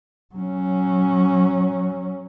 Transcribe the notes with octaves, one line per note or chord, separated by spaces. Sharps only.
F#3 C#4